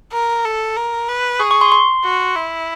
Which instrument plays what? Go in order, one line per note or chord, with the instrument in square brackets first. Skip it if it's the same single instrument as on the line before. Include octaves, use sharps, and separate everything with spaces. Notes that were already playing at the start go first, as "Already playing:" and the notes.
[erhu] A#4
A4
A#4
B4
[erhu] G#4 [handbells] C#6
[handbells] C#6
C6
C6
[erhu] F#4
E4